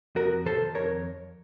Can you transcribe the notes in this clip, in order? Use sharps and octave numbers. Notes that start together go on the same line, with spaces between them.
F2 F#4 A#4
D#3 A4 C5
F2 A#4 C#5